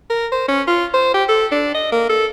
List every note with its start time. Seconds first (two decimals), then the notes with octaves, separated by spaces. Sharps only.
0.10 A#4
0.32 C5
0.48 C#4
0.67 F4
0.94 C5
1.14 G4
1.29 A4
1.52 D4
1.75 D#5
1.92 A#3
2.09 A4